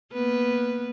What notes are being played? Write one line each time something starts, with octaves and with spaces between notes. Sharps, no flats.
A#3 B3 B4